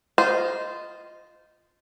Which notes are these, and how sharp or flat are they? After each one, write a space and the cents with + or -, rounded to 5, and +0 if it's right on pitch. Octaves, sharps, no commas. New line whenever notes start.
F4 +5 C5 -15 D#5 +0